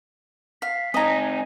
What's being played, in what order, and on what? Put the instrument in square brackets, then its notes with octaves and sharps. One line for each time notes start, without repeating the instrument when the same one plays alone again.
[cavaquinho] F5 [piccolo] B6
[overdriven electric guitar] C4 D#4 [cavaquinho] D#5 A#5 [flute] G#5